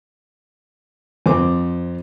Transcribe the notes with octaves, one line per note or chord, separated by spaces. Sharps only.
F2 C4 D6